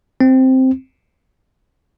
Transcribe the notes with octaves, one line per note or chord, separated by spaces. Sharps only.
C4